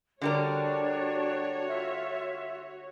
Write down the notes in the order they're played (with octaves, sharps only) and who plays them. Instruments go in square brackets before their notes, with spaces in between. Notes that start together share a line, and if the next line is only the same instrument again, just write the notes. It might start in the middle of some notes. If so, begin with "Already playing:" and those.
[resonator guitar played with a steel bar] D3 G3 A#4 [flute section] D4 [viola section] F#4 C#5
[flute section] F4 E5